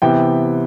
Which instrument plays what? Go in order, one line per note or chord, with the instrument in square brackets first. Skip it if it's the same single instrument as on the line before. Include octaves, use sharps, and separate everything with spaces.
[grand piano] C3 E3 B3 G5